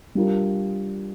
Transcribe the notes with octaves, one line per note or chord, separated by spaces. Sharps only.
G3 D4 F4 A#4